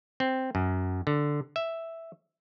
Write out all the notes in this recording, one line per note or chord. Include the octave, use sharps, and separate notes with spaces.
C4
F#2
D3
E5